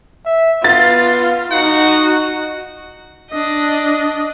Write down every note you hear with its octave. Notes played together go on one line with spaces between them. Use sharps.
E5
B3 F4 A6
D#4 F#4 F#5
D4 D#5